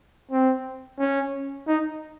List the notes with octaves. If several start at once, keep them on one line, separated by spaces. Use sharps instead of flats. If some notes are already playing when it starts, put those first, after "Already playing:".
C4
C#4
D#4